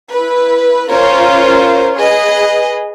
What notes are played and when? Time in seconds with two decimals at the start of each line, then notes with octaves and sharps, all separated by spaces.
0.12 E4 B4
0.90 C#4 F4 A#4 C5 C#5
1.96 G#4 B4 D#5